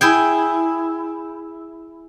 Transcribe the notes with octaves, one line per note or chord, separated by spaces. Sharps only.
E4 G#4 G5